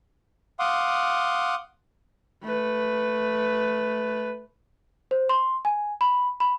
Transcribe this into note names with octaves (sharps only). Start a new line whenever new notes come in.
F5 F#5 C6 D6 D#6
A3 B4
C5
C6
G#5
B5
B5